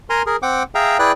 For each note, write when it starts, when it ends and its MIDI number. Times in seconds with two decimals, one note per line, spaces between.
0.10 0.22 70
0.10 0.22 80
0.10 0.22 82
0.10 0.22 84
0.26 0.36 68
0.26 0.36 70
0.42 0.63 60
0.42 0.63 78
0.42 0.63 79
0.42 0.63 86
0.75 0.97 68
0.75 0.97 76
0.75 0.97 77
0.75 0.97 79
0.75 0.97 82
0.99 1.12 64
0.99 1.12 68
0.99 1.12 71
0.99 1.12 74
0.99 1.12 79
0.99 1.12 90